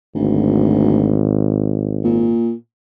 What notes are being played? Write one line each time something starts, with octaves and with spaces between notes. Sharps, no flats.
G#1 D2
A#2